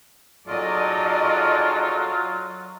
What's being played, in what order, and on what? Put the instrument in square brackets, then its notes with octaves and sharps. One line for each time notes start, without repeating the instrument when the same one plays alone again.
[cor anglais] F#3 [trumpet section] D#4 G#4 A4 [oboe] F4 [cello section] D5 D#5